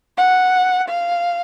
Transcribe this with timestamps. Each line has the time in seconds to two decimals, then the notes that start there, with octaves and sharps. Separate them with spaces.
0.17 F#5
0.88 F5